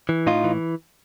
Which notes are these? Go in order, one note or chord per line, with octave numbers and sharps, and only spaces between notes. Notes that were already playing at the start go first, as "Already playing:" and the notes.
E3
A2 D#4 F4
E3